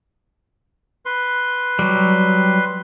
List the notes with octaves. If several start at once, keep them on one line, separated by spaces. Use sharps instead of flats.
B4 C6
F#3 G3